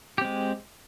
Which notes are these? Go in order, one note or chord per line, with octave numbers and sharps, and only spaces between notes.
G#3 C4 G4